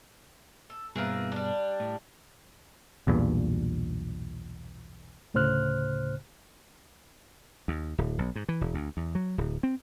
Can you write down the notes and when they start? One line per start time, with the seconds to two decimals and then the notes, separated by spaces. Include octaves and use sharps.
0.70 A4
0.96 G2 B2 E3 F3 A#3 G#4
1.32 G3 D4
1.80 A2
3.07 B1 E2 G2 A#2
5.34 D2 A2 C#3 C5 F6 F#6
7.68 D#2
7.98 D1
8.18 B1
8.36 G#2
8.49 E3
8.61 E1
8.74 D2
8.97 E2
9.15 F#3
9.38 D1
9.63 C4